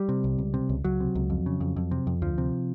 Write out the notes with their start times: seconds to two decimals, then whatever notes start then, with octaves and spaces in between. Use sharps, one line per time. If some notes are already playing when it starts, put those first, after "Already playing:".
Already playing: G3
0.09 C3
0.24 C2
0.38 C#2
0.54 C3
0.69 C#2
0.84 C#2 F#3
1.00 C3
1.15 C#2
1.30 F2
1.46 C#3
1.60 F2
1.76 F2
1.91 C3
2.07 F2
2.22 D2 F3
2.38 C3